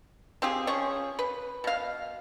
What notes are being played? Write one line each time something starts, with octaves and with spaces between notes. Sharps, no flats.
C4 F4 G4 G#4
F3 C#4 G#4 C#6
B4
B2 F5